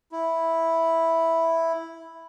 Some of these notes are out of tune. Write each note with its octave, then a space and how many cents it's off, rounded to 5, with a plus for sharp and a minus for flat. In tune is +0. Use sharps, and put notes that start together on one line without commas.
E4 -5